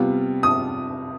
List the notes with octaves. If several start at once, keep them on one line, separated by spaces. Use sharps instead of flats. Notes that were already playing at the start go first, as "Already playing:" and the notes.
Already playing: C3 G3 B3 F4
D#6